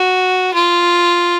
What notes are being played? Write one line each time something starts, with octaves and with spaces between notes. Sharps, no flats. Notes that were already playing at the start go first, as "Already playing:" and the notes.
Already playing: F#4
F4